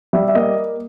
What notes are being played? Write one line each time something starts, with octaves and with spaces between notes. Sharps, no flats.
G3 E5
E5
A#3 D#5